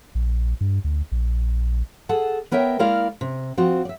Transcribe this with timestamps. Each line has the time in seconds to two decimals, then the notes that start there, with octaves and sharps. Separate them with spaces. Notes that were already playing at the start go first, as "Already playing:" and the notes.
0.15 A#1
0.61 G2
0.84 D2
1.12 A#1
2.09 G#4 A4 F#5 A5
2.51 B3 A#4 C#5 E5 G5
2.79 G#3 A#3 E4 A#4 D5 F5
3.21 C3
3.57 F3 C4 F#4
3.85 D5 E5